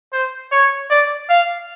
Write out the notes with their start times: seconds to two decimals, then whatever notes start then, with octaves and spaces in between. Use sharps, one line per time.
0.13 C5
0.52 C#5
0.90 D5
1.30 F5